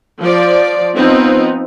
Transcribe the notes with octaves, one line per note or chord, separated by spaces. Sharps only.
F3 D5
F3 B3 C4 D#4